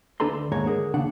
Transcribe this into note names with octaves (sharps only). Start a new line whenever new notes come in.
D2 D4 A4 B4 A#5 C6
D#2 G#2 G#3 C#5 A#5
D3 G#4 A#4
D#2 C#3 D4 F#5